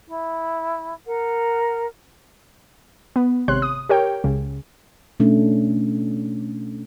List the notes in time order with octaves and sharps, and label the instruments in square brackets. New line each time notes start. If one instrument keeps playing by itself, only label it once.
[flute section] E4
A#4 F#5
[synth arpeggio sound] B3
G#1 C3 C#5 C6 F#6
D#6
G4 A#4 C#5 G5
C#2 C#3
[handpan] B2 A3 C#4 D4